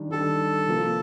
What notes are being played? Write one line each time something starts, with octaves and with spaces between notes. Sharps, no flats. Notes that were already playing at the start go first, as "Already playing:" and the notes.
Already playing: D#3 G3 D4
D#3 G3 D4 A4
C3 F3 A#3